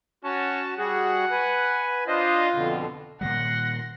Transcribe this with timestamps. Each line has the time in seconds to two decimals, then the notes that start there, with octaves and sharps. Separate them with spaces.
0.24 C#4 F#4 A5
0.78 G3 F#4 G#4 F#5
1.31 B4 G#5
2.07 D4 F4 C5 D#5
2.54 F2 B2 D3
3.21 A#2 D#3 G3 F#5 C6 A#6